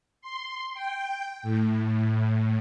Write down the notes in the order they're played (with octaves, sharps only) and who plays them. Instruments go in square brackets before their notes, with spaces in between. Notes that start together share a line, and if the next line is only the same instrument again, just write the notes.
[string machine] C6
G5
A2